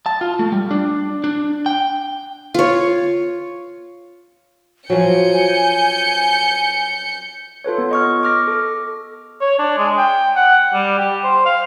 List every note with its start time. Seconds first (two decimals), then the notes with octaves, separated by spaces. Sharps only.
0.06 A5
0.21 F4
0.39 A3
0.52 G3
0.71 D4
1.24 D4
1.66 G5
2.54 F4 C#5
4.90 F3 F#3 G#5 G6 C#7
7.64 F4 A4 B4 C#5
7.78 B3
7.91 D#5 C#6 F6
8.23 D6 F6 A#6
8.47 A4
9.41 C#5
9.59 D4
9.78 G#3
9.98 G5
10.36 F#5
10.73 G3
10.98 G4
11.24 C5
11.45 F5